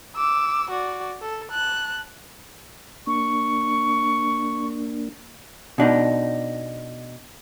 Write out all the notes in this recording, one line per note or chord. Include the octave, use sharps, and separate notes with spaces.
D6 E6
F#4 D5
A4
A5 F#6
A#3 D4 C#6
B2 D4 D#4